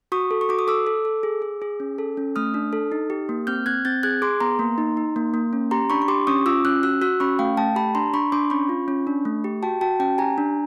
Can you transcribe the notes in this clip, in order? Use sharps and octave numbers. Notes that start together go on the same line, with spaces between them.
F#4 C#6 D#6
A4
C#6
F#4 D6
D#6
A4 D6 E6
A4
A4
G#4
G#4
G#4
C#4
A4
C#4
A3 D#6 F6
D4
A4
D#4
G4
A#3
C4 F6 G6
C4 F#6 G#6
C4 G6 A6
G#4 F#6 G#6
G#4 C6 D6
B3 A#5 C6
A#3
D#4
D#4
A#3
A#3
C#4
G4 A#5 C6
D4 B5 C#6
C#6
G4 C6 D6
C#4 C#6 D#6
F4 D6 E6
C#4 E6 F#6
F#4 E6 F#6
F#4 E6 F#6
C#4 B5 C#6
A3 F5 G5
A3 G5 A5
G4 A5 B5
D4 A#5 C6
D4 B5 C#6
D4 C6 D6
C#4 B5 C#6
F4
C#4
D4
A3
G4
F#4 G5 A5
F#4 G5 A5
C#4 G5 A5
G4 G#5 A#5
D4